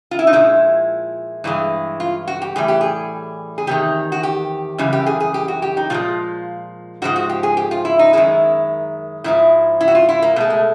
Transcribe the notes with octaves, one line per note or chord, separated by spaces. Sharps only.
F4
E4
D#4
A#2 F3 G#3 E4
G2 E3 G#3
F4
F#4
G4
A2 E3 G3 G#4
G4
G#4
G#4
E2 C3 D#3 G4
F#4
G4
F#2 C#3 E3 G3
G4
G#4
G#4
G4
F#4
G4
D#4
A#2 F3 G#3 F4
G#2 F3 G#3 F#4
F#4
G4
G#4
G4
F4
E4
D#4
F#2 D#3 G#3 E4
G#2 F3 G#3 E4
E4
F#4
F4
E4
A#3
B2 G#3 A3
A3